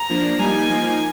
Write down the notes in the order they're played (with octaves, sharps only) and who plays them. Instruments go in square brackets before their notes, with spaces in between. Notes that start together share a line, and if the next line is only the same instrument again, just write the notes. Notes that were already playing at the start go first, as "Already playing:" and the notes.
Already playing: [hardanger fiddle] A#5
[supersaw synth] F3 A#3 D4
[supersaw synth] G3 A#3 D#4 [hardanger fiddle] G#5
[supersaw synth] F3 A#3 D#4